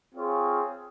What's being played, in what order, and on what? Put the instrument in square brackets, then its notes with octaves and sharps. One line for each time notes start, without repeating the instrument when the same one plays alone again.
[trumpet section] C4 F4 G#4 C#5